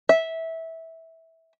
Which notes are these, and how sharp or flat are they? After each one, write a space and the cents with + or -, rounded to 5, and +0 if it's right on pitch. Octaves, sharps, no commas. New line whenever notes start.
E5 -15